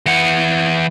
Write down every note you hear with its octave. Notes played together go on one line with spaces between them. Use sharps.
E3 F#5